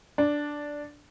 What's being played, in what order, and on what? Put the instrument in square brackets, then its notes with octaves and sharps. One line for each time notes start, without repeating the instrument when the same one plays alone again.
[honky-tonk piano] D4